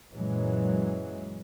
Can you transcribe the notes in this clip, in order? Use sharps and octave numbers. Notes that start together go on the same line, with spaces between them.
F#2 A#2 E3 F#3 G#3